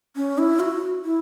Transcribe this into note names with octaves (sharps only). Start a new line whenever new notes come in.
C#4
E4
F#4
E4